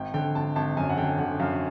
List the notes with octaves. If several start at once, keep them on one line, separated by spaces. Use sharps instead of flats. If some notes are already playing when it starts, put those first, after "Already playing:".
Already playing: G#1 G5
D3 G5
G#1 A5
G#1 A5
F#2 G#5
F#5
D3 G5
D3 F#5
F#2 F5